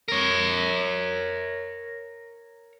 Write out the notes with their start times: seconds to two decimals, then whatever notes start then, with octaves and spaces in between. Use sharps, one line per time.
0.08 A#4 C#5